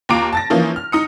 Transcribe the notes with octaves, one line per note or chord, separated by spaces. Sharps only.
D#2 F4 A#5 D6 D7
A5 A6 A#6
E3 F3 A#3 C#4 D#4
F6
D#4 D#6 C#7